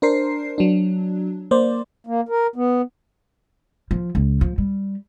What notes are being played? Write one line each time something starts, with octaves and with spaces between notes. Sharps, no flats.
D4 A#4 C5 C7
F#3 D4
A#3 C5 D5
A#3
A#4
B3
F3
C#2
F3
G3